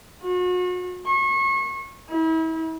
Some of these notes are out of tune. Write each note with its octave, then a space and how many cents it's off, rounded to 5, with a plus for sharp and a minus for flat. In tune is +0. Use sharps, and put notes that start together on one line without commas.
F#4 -40
C#6 -30
E4 -35